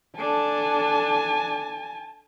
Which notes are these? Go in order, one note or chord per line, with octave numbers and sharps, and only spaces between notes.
D4 A4 G#5 A5